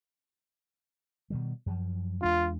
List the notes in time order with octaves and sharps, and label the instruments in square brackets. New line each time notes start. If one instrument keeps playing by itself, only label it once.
[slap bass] B2 D#3 G3
F#2 F3
[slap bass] E2 G#3 D4 [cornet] F4